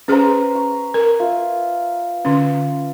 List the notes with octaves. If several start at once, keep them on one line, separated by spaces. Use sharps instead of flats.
C#4 G#4 B4 C5 A#5
C#6
A#4
F4 E5
D3 C#4